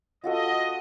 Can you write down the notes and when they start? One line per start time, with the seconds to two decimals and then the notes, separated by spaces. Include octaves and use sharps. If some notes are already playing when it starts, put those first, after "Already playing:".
0.24 F4 F#4 A4 D#5